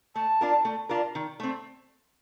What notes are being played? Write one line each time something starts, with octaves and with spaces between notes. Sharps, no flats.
A3 A5
D4 F4 A#4
A3
D4 F4 A#4
D#3
A3 C4